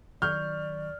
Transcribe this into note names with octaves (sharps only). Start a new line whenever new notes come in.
D#3 F#3 D5 C#6 F6 G6